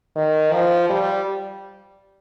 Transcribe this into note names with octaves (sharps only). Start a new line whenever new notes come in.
D#3
F3
G3